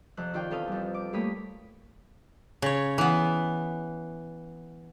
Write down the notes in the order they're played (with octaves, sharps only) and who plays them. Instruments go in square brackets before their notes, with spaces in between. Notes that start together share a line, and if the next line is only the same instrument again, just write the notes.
[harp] F2 C3 F3 F#6
D#3 F4 D5 G5
E2 C3 A4 B4 F5 D#6
F2 G3
D6
G3 A3 A#3 C#5 B5 D#6
[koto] C#3 C#5
E3 B3